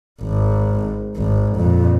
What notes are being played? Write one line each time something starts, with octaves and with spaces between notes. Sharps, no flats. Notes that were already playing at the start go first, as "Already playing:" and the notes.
G#1
G#1
F2 A#2